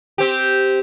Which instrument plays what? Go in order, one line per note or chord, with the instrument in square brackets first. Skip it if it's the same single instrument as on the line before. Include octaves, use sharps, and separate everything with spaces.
[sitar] C4 G4